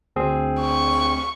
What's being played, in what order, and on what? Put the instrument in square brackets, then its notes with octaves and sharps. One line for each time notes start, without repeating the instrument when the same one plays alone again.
[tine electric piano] D2 C4 G#4
[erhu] C#6